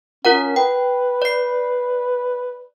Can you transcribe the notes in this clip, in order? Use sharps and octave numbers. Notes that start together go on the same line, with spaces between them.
C#4 F4 A#4 F#5
B4 G5
D5 C7